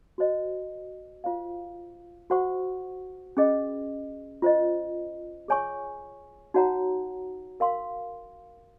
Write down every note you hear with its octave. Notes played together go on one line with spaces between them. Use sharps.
F#4 C5 D#5
F4 C5 F5
F#4 C5 F#5 C#6
C#4 G#4 D#5
F4 C5 D#5
G#4 C#5 G#5 C#6
D#4 F#4 C#5 F#5 A#5
A#4 F5 C6